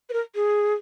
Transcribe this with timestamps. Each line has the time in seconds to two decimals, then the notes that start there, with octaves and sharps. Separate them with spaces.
0.09 B4
0.13 A#4
0.35 G#4